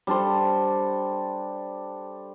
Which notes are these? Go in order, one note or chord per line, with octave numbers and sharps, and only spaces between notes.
G3 D4 A4 C5